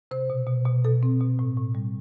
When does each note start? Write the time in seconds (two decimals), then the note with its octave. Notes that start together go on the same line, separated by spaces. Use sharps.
0.11 C3 C5
0.30 B2
0.47 B2
0.66 B2
0.85 B2 A4
1.03 C4
1.20 B2
1.39 A2
1.57 A2
1.75 G3